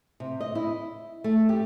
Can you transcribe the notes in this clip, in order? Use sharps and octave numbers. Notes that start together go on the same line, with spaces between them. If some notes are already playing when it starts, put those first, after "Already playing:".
C3
D#5
E4
A3
G4